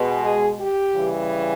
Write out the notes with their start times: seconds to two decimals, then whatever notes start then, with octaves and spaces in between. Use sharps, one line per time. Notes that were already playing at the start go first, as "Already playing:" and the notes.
Already playing: B2 G#3
0.24 G#4
0.61 G4
0.96 C#3 E3 G3